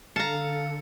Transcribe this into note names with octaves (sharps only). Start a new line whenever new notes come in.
D3 A4 F5 A5 A#5 C#7